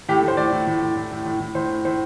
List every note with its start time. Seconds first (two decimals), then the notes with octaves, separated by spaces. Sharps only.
0.09 A2 G4
0.18 A4
0.23 A2
0.28 C5
0.37 A2 D5
0.52 A2
0.67 A2
0.82 A2
0.96 A2
1.12 A2
1.25 A2
1.40 A2
1.55 A2 C5
1.70 A2
1.85 A2 C5